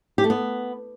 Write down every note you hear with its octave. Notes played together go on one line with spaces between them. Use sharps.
G4
A3
B3